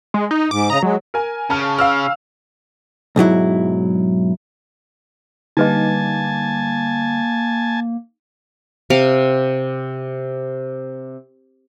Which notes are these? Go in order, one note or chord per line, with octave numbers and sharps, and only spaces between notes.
G#3
D#4
G#2 D6
C#3 D#5 A#5
F#3 G#3
A#4 G#5
C#3 A5 F6
F5 E6 F6
B1 G#2 F#3 E4
D3 G3 A#3 D#4 B4 D#5 G#5 A5
C3 F5 D6